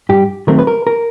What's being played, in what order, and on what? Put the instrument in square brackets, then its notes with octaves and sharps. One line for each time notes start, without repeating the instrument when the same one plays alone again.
[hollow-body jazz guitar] G2 G4
D#3 F#3 A3 C4 A#4
B4
A#4
A#4